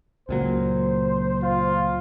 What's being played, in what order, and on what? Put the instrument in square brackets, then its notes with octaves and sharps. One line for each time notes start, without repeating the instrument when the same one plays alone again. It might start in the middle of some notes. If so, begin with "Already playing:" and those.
[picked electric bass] C#2 A#2 F#3 [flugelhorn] C5
[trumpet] F4